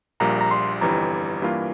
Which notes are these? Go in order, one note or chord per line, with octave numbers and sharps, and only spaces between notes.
A#1 A#2 G3 A#3 A#5
A#5
C6
G1 F2 E3 G3 A#5
G2 E3 A#3 F4